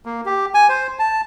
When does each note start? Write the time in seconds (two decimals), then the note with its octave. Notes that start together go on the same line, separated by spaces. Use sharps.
0.06 A#3
0.25 G4
0.54 G#5
0.69 C5
0.99 A5